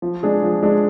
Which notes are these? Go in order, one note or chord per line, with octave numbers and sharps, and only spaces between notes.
F3
G#3 D4 G#4
F3
G#3 D4 G#4